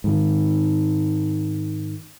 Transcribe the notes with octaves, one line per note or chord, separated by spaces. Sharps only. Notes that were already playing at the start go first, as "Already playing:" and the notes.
G#2 D#3